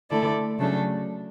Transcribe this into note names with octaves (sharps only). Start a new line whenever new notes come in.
D3 A3 E4 A4 D5
C#3 F#3 A3 D4 A4